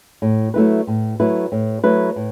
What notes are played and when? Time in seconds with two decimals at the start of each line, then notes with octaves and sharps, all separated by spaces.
0.22 A2
0.54 F#3 A3 E4 B4
0.87 A2
1.20 F#3 A3 E4 B4
1.52 A2
1.83 F#3 A3 E4 B4
2.16 A2